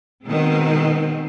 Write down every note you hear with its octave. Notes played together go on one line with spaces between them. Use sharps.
B2 D#3 G#3 C4